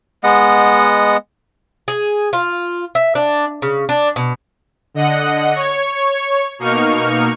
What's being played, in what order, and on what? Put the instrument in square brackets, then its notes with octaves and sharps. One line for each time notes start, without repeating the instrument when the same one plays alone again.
[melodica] G#3 B3 D#5 F#5
[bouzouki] G#4
F4
E5
D4
C#3
D4
B2
[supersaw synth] D3 D#5 F#5
C#5 C#6
B2 A#3 D#4 C#6 F6